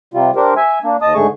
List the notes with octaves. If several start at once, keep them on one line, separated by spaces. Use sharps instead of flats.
C3 G3 F4
D4 G4 A#4 C5
E5 G#5
A#3 D4
D#2 D#5 A5 D#6
G#2 D3 A3 G#4 C#6